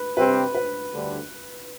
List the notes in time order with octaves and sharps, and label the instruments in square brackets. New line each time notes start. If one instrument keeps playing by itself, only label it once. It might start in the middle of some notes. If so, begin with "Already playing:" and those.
Already playing: [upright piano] B4
[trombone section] C3 G3 C4 G4 C5 [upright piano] B4
[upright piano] B4
[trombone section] D2 D3 G3